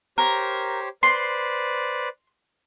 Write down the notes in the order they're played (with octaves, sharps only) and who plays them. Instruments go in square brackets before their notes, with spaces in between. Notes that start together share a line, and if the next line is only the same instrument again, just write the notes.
[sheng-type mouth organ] G4 C5 C#5 [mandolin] A#4
[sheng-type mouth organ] B4 C5 D5 [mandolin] C6